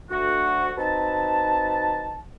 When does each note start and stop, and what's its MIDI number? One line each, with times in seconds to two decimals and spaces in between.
0.10 0.71 38
0.10 0.71 66
0.78 2.17 60
0.78 2.17 63
0.78 2.17 66
0.78 2.17 71
0.78 2.17 81